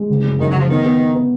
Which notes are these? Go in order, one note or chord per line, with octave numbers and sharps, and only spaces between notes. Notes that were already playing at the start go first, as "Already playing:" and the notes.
Already playing: G#3
F#1
F#2
F#2 D#3
F#3
F#1
F3
D#3 B3
B3
B3
B3